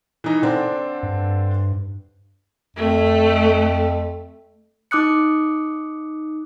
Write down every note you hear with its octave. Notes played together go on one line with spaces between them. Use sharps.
E3 D#4
D3 C4 D4
G2
F2 A3
D#4 D6 D#6 F#6 C#7